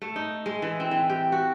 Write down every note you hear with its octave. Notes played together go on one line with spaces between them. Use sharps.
A3
D#4
G#3
E3
C4
E3
G4
F#4